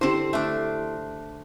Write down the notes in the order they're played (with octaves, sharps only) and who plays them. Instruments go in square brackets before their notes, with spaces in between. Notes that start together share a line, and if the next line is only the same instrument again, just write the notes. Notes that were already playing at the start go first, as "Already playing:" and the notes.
[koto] D3 [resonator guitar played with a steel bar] C4 C5 [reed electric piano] E4 G4
[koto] A3 D4